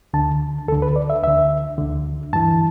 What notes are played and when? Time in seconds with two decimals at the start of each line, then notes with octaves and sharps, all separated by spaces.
0.13 D2 D3 A5
0.68 D2 D3 A4
0.82 B4
0.96 D5
1.10 E5
1.23 D2 D3 E5
1.78 D2 D3
2.33 G2 E3 A5